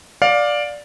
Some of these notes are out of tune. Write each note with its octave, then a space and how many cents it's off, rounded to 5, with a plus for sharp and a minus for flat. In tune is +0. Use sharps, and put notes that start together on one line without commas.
D5 +0 F5 +20